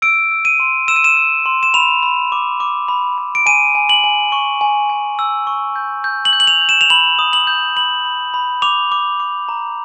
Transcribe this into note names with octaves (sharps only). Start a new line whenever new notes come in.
E6 D7
E6
D#7
C6
E6 E7
D#7
E7
E6
C6
E7
B5 F7
B5
D6
D6
B5
B5
D7
G#5 D#7
G#5
F#7
G#5
C#6
G#5
G#5
E6
C#6
G6
G6
F#7
G6
F#7
F7
G6
E7
F7
B5 F#7
D#6
F#7
G6
B5 F#7
B5
B5
D6 F7
D6
D6
A#5